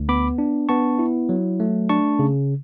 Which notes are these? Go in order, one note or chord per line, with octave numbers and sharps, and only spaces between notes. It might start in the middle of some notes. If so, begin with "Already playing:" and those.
Already playing: D2
B3 B5 D6
D4
B3 A5 C#6
E4
F#3
A3
D4 A5 C#6
C#3